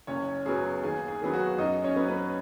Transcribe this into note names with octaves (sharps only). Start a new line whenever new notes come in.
F#1 C#4 C#5
F#2 F#3 B3 G#4
D#2 G#4
G#4
D#3 F#3 B3 G#4
F#4
F#2 D#4 D#5
C#4 C#5
F#3 B3
B3 B4